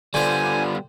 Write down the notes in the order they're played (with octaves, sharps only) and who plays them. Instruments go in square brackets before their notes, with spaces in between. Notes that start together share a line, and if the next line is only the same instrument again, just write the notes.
[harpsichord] D3 C5 [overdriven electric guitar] G3 B3 [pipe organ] D4 F4 [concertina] G#5